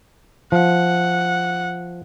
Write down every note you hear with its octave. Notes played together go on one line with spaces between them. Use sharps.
F3 F#5